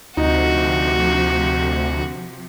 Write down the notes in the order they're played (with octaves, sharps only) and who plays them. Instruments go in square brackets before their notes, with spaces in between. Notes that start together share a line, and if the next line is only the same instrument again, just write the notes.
[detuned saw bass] D2 [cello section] C3 F3 [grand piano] D#4 [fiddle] F#4